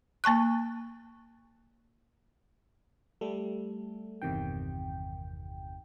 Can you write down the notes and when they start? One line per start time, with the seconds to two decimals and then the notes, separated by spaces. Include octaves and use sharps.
0.24 A#3 A5 C#6 F#6
3.21 G3 A3 A4
4.22 G1 E2 C3 D#3 G5